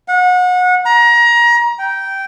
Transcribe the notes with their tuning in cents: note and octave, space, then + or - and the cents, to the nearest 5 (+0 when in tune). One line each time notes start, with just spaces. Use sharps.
F#5 -30
A#5 +25
G5 -10